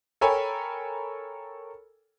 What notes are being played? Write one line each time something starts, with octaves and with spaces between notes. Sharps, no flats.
A4 A#4 C#5 G5 G#5 B5